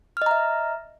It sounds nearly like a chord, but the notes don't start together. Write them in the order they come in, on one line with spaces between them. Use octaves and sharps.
F6 D#5 A#5 E5